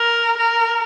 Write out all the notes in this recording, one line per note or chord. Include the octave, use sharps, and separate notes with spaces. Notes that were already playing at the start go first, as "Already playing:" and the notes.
Already playing: A#4
A#4